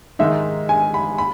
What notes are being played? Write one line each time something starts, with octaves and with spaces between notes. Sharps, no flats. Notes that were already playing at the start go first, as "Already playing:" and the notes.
G#2 D#3 G#3 D#4 E5
G#5
B5
B5